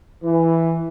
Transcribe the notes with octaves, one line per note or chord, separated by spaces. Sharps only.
E3